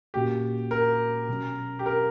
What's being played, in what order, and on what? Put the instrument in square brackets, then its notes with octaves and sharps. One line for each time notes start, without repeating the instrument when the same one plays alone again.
[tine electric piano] A#2 A#3 C#4 F#4 [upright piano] G4
[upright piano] A#4
[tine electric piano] B2 F#3 C#4
[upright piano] G4
A#4